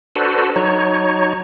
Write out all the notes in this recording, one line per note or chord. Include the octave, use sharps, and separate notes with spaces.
D4 F#4 A4 B4 C5
F#3 D#4 C#5